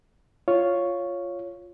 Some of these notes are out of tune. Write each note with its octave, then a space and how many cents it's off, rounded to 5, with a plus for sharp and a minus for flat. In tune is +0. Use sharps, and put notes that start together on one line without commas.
F4 +0 C#5 +0